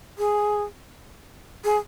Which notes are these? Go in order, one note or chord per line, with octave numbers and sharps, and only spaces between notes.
G#4
G#4